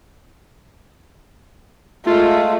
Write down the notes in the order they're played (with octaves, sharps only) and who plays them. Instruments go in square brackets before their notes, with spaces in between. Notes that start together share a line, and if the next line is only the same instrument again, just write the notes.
[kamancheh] G#3 A3 [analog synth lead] F4